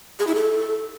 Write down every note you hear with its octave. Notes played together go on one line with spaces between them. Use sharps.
G#4
E4
A4